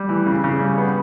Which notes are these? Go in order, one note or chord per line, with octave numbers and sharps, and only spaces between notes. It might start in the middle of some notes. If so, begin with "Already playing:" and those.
Already playing: G3
E3
C#3
C#3
G3
B3